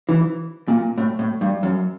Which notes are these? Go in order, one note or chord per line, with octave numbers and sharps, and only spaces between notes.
E3
A#2
A2
A2
G2
F#2